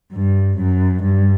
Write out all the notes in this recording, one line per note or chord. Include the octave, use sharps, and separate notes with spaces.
G2
F#2
G2